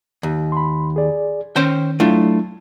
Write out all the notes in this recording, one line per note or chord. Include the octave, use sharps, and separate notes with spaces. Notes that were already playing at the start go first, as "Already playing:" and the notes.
D#2
B5 C6
G#4 D5
D#3 C#4 C5 G5
F#3 A3 D4 E4 F4